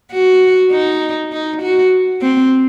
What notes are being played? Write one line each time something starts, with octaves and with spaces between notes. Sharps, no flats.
F#4
D#4
D#4
F#4
C4